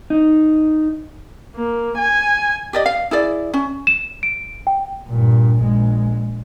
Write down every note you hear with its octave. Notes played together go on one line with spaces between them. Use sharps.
D#4
A#3
G#5
G4 D5 D#5
F5
E4 G#4 D5
C#4
E7
D7
G5
G2 A#2
A#1 G#3